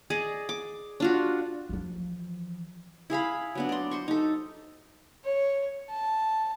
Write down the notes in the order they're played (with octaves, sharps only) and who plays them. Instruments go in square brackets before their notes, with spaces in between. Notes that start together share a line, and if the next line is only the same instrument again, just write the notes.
[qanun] G#4 D5 D#5
D6
D4 F4 F#4
[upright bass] E3 F3
[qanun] E4 G#4 F5 B5
F#3 B3 D4
D5 C6
C5 C6 C#6
D#4 A4
[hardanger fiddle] C#5
A5